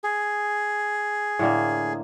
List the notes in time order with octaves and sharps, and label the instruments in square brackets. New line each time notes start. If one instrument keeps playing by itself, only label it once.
[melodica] G#4
[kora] A2 D3 A#3